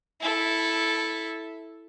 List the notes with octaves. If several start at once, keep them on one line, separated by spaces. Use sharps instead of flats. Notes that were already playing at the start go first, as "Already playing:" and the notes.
E4 A4